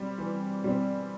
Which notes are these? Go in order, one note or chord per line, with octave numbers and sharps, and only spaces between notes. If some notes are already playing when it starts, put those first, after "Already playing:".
Already playing: G3 C4
E3
G3 C4